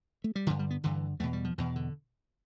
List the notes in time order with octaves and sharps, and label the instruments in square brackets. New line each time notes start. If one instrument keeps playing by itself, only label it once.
[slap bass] A3
G3
D3 F3
G2
G3
B3
G2 D3 E3
E2 B2 A3
G3
F3
E2 B2 E3
D3